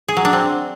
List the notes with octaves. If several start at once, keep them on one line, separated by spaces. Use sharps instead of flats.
G#4
F#3
D4
C4